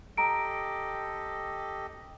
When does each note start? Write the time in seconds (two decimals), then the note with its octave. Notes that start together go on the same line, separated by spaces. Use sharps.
0.18 G4 A4 D#5 A#5 D7